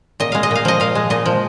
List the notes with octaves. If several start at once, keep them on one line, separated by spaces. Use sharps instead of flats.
A#2 D#5
G#3 F5
D#5
A#2 F5
F3 D#5
A#2 F5
G#3
A#2 D#5
F3